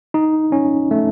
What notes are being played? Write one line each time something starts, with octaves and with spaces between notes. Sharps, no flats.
D#4
C#4
A3